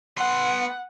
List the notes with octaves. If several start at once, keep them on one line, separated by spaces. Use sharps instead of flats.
B3 F#5 C6